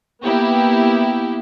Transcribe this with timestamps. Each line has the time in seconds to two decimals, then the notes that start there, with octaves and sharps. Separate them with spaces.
0.23 A#3 B3 E4 G4